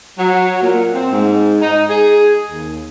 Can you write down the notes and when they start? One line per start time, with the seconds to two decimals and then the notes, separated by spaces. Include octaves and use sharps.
0.18 F#3
0.60 A#2
0.92 C4
1.11 G#2
1.61 D#4
1.89 G#4
2.49 D#2